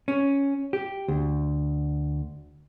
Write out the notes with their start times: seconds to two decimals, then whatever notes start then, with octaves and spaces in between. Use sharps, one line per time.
0.08 C#4
0.73 G4
1.08 D2